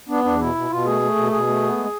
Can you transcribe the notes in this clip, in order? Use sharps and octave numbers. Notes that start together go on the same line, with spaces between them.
B3 D4
E2 D4
B2 E4
B2
B2 F4
A3 G#4
A3
B2
B2 G#4
A3
B3
G#3